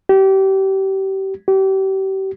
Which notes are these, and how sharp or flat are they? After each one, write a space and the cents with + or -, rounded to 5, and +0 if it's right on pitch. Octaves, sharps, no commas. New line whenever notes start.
G4 -30
G4 -35